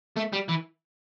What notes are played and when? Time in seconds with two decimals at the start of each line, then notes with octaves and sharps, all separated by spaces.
0.16 A3
0.33 G3
0.48 E3